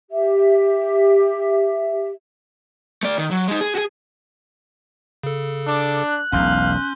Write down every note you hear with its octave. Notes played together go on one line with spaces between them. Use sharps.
G4 E5
A3 D5
D#3
F#3
G#3 D#4
G#4
F#4 G#4
C#3 A4
D4 D6
F#6
E1 B1 C#4 F5 C6 G6